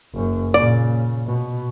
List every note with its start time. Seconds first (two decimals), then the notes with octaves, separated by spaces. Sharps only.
0.14 F#1 F#2
0.54 A#2 C#3 D5
1.26 B2